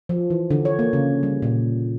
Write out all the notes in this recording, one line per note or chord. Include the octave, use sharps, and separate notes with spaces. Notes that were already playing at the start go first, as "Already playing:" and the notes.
F3
E3
D3
C#5
A#3
C#3
G3
A#2